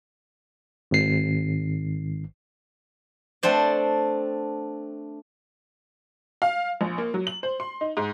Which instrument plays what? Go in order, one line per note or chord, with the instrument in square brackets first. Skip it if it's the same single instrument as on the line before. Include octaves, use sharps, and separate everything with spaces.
[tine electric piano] G#1 C7
[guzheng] A3 C4 D4 C5 D5
[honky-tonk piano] F5
A#1
A#3
F#3
F#7
C5
C6
D#4
G#2